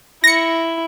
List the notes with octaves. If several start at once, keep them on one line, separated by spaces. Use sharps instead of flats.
E4 A#6 C#7